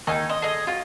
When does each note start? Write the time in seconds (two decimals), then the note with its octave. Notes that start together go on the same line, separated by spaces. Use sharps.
0.07 D#2 D#3 D#4 G#5
0.29 D#5 C6
0.42 G#4 A4 D#5
0.67 F4 F#4